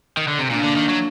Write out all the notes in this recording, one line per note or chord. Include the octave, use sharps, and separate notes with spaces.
D#3
D3
C3
A#2 A#3 D4
D3
D#3
F#3